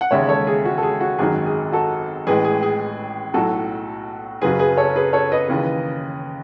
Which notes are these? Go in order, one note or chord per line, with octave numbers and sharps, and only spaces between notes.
F#5
E1 D#2 C#3 G#3 C#5 E5
A4 C#5
G#4
F#4
A4
G#4
F#4
G#1 F#2 D#3 F#3 G#4
G#4
F#4 A4
A1 A2 G#3 G#4 B4
G#4
G#4
B1 A2 F#3 F#4 A4
F#1 F#2 C#3 F#3 G#4 B4
G#4 B4
A4 C#5
G#4 B4
A4 C#5
B4 D#5
D#2 C#3 E3